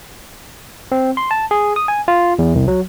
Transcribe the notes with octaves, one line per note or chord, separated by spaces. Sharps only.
C4
C6
A5
G#4
D#6
G#5
F4
E2
C2
F#3